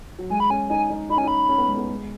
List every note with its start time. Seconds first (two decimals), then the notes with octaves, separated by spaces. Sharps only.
0.19 F#3
0.30 G#3 G#5
0.40 B5
0.50 C#4 G#5
0.69 D#4 G#5
0.90 D#4
1.09 D#4 B5
1.17 C#4 G#5
1.24 D#4 B5
1.49 C#4
1.58 B3
1.67 G#3
1.76 B3
1.89 G#3